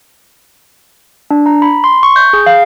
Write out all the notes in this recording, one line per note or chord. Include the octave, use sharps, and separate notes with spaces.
D4
A#5
B5
C6
C#6
G6
G#4
F5